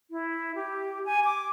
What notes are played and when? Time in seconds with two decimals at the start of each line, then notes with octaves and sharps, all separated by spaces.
0.11 E4
0.55 G4
1.05 G#5
1.25 D6